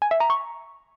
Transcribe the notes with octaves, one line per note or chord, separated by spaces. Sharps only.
G#5
E5
A#5
C#6